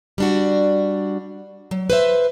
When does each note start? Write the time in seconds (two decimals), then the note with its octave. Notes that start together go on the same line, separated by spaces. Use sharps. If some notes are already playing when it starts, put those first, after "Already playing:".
0.18 G3 D4 F#4
1.71 F#3
1.90 B4 C5 E5